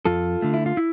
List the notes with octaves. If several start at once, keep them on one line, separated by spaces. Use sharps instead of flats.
F2 F4 A4
D3 A3
E4
F4
E4